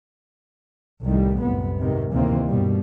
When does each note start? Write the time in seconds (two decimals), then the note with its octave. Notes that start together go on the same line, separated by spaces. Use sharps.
1.05 C2 A2 D#3 G3
1.40 F1 C2 F#2 A2 C3 B3
1.79 G#2 C3 D#3
2.12 D2 C3 D#3 E3 A#3 C4
2.47 G2 B2 G3